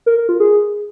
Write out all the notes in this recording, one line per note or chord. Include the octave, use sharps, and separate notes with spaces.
A#4
A#4
F4
G#4